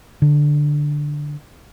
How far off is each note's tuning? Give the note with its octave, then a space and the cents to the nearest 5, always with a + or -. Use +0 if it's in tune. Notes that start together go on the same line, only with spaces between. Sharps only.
D3 +5